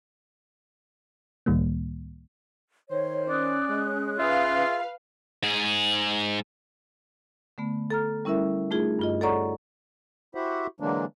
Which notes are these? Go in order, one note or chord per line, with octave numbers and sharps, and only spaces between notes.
C#2 A2 D#3 G3 A#3
D#3 C5 C#5
C#4 D5 D#6 F#6
G#3
F4 G#4 B4 E5 F5
G#2 G#4
D3 A3 B3
A4 A#5 F6
G3 C#4 E4 A#4 E5
A3 D#4 F4 G#4
G2 F4 D#5
A4 C#5 D5 F#5 A#5 C#6
E4 F#4 G4 C5 E5 F#5
D3 E3 F#3 G#3 A#3 D4